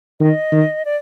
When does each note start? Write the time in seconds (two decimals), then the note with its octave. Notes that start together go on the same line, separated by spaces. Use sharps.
0.20 D#3 D#5
0.52 D#3
0.85 D5